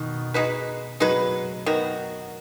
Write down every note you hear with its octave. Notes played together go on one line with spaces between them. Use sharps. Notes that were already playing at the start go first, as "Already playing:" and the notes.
Already playing: B2 D#3
G#3 D#4 F#4 B4
F#3 G#3 D#4 F#4 B4
D#3 B3 F#4